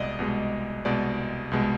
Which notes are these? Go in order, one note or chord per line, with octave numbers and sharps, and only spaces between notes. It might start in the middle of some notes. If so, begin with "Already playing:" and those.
Already playing: C2 B2 G#3 D5 D#5
C2 B2 G#3
C2 B2 G#3 D5
C2 B2 G#3